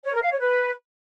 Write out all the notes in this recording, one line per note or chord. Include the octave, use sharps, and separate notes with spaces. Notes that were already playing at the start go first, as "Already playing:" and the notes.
C#5
A#4
F5
C#5
B4